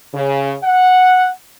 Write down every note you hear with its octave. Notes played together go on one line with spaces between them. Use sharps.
C#3
F#5